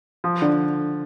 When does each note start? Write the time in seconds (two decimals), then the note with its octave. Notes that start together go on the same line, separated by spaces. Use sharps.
0.24 F3
0.42 D3